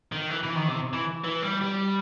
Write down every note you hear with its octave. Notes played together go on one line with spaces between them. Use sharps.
D#3
E3
E3
D#3
C3
E3
E3
G3
G3